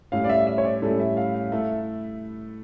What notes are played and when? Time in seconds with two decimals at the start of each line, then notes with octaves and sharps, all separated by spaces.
0.12 A2 G3 C#4 E4 F5
0.24 D5
0.29 E5
0.47 E5
0.58 C#5
0.65 D5
0.82 A2 G3 C#4 E4 A4
0.99 E5
1.17 F5
1.35 F5
1.52 A3 E4 A4 E5